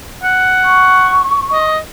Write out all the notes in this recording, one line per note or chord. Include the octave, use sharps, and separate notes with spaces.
F#5
C#6
D#5